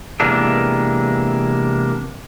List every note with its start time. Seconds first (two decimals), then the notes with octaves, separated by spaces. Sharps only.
0.20 C3 E3 G#3 A#3 B3 D4